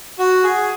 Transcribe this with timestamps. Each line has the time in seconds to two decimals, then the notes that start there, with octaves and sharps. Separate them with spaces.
0.19 F#4
0.44 G#4